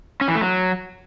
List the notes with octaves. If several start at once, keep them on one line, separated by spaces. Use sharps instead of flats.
C#4
E3
A3
F#3